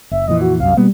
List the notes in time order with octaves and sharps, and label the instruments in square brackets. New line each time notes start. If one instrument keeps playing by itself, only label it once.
[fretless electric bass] F#1 [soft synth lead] E5
[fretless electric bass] F2 A#2 E3 [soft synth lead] D#5
[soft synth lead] F#4
[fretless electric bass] C2 F#2 [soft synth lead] F5
[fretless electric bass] B2 A#3 B3 [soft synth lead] G3